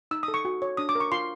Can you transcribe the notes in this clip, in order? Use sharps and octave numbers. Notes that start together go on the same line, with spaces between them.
D#4 E6
D#6
A4
C#6
F#4
C#5
D4 D#6
D6
A#4 C#6
F4 C6